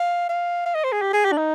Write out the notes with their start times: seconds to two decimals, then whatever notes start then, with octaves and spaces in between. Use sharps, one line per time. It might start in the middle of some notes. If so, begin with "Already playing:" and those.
Already playing: F5
0.30 F5
0.66 F5
0.75 D#5
0.84 C5
0.92 G#4
1.02 G4
1.13 G#4
1.25 G4
1.32 D4
1.38 D#4